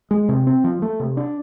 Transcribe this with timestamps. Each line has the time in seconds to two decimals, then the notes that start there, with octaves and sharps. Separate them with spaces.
0.11 G#3
0.29 C3
0.47 C4
0.64 F3
0.82 A3
1.00 C3
1.17 D4